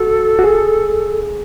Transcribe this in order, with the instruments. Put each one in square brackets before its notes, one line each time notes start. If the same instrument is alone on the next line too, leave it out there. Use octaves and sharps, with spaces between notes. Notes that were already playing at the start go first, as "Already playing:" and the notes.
Already playing: [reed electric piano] F#4 [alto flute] A4
[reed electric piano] F#4
G#4